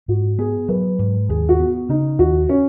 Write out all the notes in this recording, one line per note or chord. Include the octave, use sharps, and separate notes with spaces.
G#2 F#4
B3 G#4
F#3 B4
G#2
D#2 G#4
F#4
B3
C#3 D#4
D#2 F#4
C#4